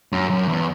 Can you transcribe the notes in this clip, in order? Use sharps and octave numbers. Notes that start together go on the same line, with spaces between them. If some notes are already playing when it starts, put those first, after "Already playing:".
F#2
F#2
E2